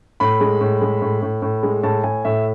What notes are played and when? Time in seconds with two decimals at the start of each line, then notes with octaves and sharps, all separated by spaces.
0.20 A2 B5
0.40 G#3
0.61 A2
0.81 G#3
1.02 A2
1.22 A2
1.42 A2
1.63 G#3
1.83 A2 A5
2.04 A2 G#5
2.25 A2 E5